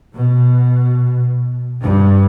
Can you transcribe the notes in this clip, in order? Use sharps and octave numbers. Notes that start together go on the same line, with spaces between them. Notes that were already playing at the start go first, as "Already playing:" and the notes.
B2
G2